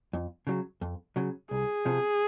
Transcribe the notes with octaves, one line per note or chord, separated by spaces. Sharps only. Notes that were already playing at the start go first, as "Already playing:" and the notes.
F2
C#3 F#3
F2
C#3 F#3
C2 G#4
C3 F3